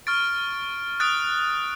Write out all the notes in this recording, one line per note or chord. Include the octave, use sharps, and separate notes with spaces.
C#6 F6 A6 D7
D#6 F#6 A6 D7